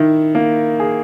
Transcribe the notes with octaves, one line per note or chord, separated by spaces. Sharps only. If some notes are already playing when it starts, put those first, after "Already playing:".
Already playing: D#3 E4
A#3
G#4